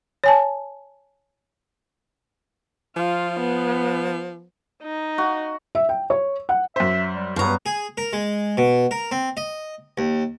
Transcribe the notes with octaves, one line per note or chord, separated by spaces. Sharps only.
C#5 G#5 A5
F3 F4
B3
D#4
F#4
E5
G5
C#5
F#5
F#2 C5 E5
G3
G2 B3 C#5 F5 A5 A#5
G#4
A#4
G#3
B2
A#4
C4
D#5
D#2